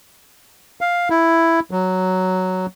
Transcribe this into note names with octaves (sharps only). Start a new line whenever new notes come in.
F5
E4
F#3